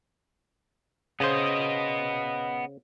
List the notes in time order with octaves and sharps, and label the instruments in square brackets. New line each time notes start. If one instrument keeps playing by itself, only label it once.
[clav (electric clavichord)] C#3 C5 [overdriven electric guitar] B3 D#5